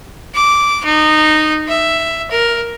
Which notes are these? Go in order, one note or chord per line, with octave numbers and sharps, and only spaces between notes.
D6
D#4
E5
A#4